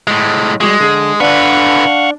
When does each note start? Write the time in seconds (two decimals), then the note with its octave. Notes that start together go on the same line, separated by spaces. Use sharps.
0.07 A2 G#3
0.61 G3 G#3 F#4 G#4
0.80 D3 G#4
1.20 D3 D4 B4 F5 F#5 C#6